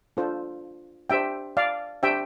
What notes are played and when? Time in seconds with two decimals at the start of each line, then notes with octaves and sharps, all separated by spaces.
0.17 D4 F4 A4 C5
1.10 D4 G4 C5 E5 G5
1.57 D5 F5
2.03 D4 G4 C5 E5 G5